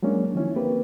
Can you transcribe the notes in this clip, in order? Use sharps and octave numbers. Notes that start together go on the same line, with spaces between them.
F#3 G#3 A#3 C#4 D4
D#3 F3 C#4 E4
A#3 C4 G4 B4